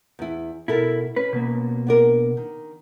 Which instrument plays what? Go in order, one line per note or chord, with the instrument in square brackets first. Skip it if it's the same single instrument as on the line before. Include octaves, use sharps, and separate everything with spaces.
[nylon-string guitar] E2 E4
[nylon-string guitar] B2 A4 A#4 [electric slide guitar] E4
[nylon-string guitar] C#4 [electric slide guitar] B4
[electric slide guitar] B2 A#3
[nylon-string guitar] B3 D4 A#4
D#3